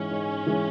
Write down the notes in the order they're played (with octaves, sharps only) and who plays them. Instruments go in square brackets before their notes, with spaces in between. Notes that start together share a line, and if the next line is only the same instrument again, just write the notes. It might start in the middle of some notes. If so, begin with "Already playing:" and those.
Already playing: [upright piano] G#2 E3 G#3 [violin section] C#4
[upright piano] G#2
E3 G#3